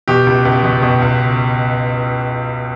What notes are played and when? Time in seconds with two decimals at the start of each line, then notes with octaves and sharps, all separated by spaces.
0.08 B2 G4
0.27 C#2
0.45 C#2
0.64 B2
0.82 B2
1.02 C#2